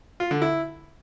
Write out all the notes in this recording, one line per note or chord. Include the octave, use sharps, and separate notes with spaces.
F4
D3
E4